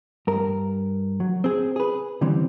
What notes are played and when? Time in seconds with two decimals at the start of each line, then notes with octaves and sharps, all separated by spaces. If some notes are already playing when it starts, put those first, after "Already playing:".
0.27 G2 A#4
1.20 F#3
1.44 C4 G#4
1.76 G#4 B4
2.21 D3 E3 G3 C4 C#4